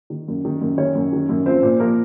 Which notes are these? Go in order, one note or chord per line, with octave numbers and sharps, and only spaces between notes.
D#3
F#2
D#3
F#2
D#3 C#4 C#5
F#2
D#3
F#2
F3 C4 C5
A#2
F3 A#3 A#4